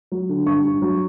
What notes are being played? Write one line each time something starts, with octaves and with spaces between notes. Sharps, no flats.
F#3
D3
G2 C#6
G2
F#3